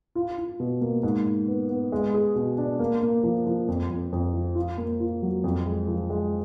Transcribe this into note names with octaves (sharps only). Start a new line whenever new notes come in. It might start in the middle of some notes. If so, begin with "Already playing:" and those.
F4
F4
B2
A#3
G#2
G#2
B3
B3
G#3
G#4
B2
D4
A#3
A#3
F3
F3
F2
F2
F2
F3
F4
A#3
F4
F#3
F2
G#3
F3
G#3